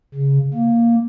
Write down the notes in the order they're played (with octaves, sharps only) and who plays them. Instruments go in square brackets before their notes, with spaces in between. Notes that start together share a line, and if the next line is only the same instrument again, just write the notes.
[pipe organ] C#3
A#3